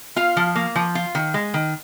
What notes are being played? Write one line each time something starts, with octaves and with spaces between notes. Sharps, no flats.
F4 F5
F3
A#3
F3
F4
D#3
G#3
D#3